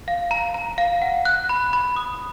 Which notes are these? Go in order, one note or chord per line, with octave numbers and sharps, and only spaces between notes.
F5
A#5
A#5
F5
F#5
F#6
B5
B5
D#6